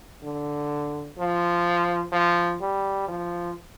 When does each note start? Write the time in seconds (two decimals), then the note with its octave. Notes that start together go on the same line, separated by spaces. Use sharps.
0.23 D3
1.18 F3
2.12 F3
2.61 G3
3.08 F3